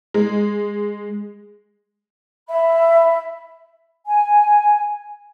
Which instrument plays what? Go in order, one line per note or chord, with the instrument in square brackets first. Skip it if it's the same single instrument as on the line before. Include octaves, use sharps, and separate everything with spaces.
[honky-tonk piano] G#3
[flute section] E5 B5
G#5